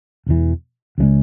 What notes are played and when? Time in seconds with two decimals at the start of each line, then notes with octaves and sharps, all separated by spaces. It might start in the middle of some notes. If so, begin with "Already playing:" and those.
0.26 E1 E2 E3
0.98 C#2 C#3 E3 G#3